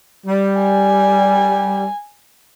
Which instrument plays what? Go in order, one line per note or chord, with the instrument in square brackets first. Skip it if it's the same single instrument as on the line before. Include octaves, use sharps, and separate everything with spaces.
[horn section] G3
[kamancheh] G#5